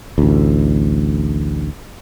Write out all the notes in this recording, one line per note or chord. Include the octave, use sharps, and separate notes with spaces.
A1 D2